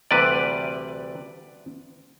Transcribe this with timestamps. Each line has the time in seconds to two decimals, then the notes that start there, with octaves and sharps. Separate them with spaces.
0.11 D2 C3 E3 G3 B4 D5